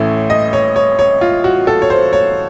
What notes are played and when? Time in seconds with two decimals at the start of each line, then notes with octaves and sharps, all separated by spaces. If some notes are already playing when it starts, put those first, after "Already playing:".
Already playing: A1 A2 A3 C#4
0.30 D#5
0.53 C#5
0.76 C#5
0.99 C#5
1.21 F4
1.44 F#4
1.67 A4
1.82 C#5
1.90 C5
2.13 C#5